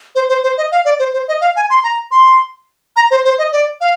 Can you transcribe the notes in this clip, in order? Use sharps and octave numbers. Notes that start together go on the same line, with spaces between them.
C5
C5
C5
D#5
F5
D5
C5
C5
D#5
F5
G#5
C6
A#5
C6
A#5
C5
C5
D#5
D5
F5